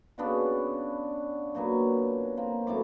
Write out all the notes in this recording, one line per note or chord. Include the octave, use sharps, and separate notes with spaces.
C#3 B3 D4 F#4
A#2 F#3 B3 G#5
A#3 C4
F#2 A2 B3 D6